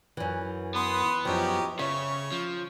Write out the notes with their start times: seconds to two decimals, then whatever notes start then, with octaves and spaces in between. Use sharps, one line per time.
0.17 F#2 E3
0.75 B3 B5 C6 D#6
1.25 F#2 F3 C#4 D#4 G4
1.79 C#3 C#5 E5
2.32 F3